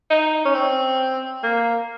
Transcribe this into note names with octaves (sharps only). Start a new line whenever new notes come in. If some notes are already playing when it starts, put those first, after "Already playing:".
D#4
C#4
C4
A#3